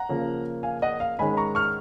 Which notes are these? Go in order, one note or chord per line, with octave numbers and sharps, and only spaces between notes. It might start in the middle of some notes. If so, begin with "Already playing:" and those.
Already playing: F#5 A#5
C#3 F3 A#3 C#4
F5 G#5
D#5 F#5
F5
G#2 D#3 G#3 C#4 G#5 B5
A#5 C#6
C#6 F6